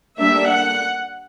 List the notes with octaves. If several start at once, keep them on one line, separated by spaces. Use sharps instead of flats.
G3 A#3 D4 E5
F#5